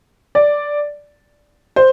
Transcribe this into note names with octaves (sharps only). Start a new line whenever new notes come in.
D5
C5